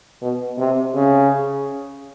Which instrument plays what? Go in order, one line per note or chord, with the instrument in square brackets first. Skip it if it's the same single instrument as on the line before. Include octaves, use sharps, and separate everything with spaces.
[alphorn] B2
C3
C#3